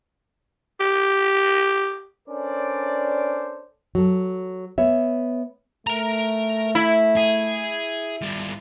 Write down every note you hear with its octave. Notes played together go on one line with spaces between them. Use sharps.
G4
C#4 D4 A4 A#4 C5 D5
F#3 A4
B3 C#5 E5
A3 A#4 A#5
E4
G#4
G2 F4